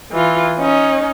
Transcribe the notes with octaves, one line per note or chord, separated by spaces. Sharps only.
E3 F4
C#4 D#4